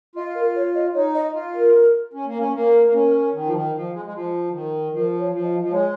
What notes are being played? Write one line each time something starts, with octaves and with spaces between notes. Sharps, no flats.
F4 D#5
A#4
C#5
D#5
D#4 C#5
D#5
F4
A#4
C#4
A#3
C#4
A#3 A#4
A#3
C#4
D#3
F3
D#3
F3
G#3
G#3
F3
D#3
F3 A#4
C#5
F3
D#5
F3
G#3 C#5